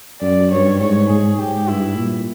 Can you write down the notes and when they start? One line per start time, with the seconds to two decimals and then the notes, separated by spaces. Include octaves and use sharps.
0.21 F#2 D5
0.51 G2 C#5
0.80 G#2 C#5
1.09 G#2 G#4
1.39 G#2 G4
1.67 G2 E4
1.97 A#2